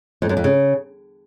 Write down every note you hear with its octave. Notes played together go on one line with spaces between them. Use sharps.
F2
F#2
F2
C#3